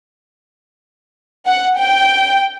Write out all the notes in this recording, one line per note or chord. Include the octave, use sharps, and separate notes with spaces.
F#5
G5